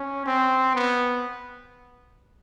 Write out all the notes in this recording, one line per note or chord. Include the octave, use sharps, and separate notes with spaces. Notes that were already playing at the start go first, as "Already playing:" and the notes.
Already playing: C#4
C4
B3